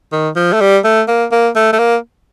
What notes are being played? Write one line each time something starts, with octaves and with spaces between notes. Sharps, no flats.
D#3
F3
A3
G3
A3
A#3
A#3
A3
A3
A#3